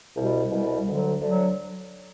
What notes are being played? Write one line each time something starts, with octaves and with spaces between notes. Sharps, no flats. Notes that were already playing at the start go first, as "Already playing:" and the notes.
C2 B2 G3
C2 B2 G3
D2 D3 F#3
D2 D3 F#3